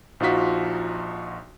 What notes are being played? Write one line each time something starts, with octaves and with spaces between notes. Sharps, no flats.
A#1 F3 D#4 F4 F#4 B6